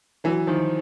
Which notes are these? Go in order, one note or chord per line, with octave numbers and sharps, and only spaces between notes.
E3 F#3
D#3 F3